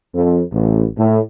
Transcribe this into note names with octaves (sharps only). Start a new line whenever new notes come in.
F2
A1
A2